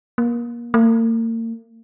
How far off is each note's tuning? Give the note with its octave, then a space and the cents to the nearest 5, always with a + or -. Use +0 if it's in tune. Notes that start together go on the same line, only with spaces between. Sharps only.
A#3 +30
A#3 -40